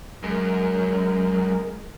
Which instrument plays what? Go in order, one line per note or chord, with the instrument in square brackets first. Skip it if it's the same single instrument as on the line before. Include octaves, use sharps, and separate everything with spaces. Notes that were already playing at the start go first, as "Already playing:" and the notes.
[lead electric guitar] F#2 [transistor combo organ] G#3 A#4